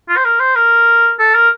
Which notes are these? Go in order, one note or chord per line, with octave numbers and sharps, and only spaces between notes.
F4
C5
A#4
C5
A#4
A4
A#4